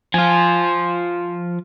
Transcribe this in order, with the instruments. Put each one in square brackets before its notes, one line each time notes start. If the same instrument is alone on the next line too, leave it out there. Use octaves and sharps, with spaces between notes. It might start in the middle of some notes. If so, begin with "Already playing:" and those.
[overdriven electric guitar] F3 F4 [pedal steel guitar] G#5